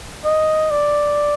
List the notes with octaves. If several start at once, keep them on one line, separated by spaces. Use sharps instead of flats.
D#5
D5